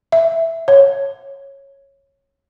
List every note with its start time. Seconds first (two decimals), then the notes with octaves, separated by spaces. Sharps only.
0.12 E5
0.68 C#5